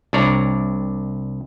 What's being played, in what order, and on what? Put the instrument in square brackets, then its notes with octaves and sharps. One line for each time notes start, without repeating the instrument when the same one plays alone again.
[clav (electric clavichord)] C2 G3 D4 C#5 D5 A#5